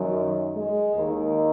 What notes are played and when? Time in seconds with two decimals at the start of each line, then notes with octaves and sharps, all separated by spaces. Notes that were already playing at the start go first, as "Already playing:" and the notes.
Already playing: F#2 D#3 F#3
0.55 G#3
0.94 D#2 D#3